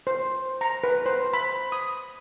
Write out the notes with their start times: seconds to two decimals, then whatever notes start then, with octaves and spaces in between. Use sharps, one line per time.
0.07 C5
0.61 A#5
0.84 B4
1.06 C5
1.34 B5
1.72 D#6